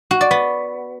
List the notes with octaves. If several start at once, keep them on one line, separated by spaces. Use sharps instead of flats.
F#4
D5
B3